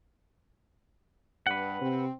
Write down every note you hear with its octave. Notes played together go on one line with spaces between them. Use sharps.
G2 B4 F#5
C3 C4